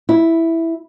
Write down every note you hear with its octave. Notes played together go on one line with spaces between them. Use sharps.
E4